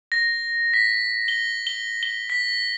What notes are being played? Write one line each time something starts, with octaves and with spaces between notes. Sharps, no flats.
A#6
B6
G7
G7
G7
B6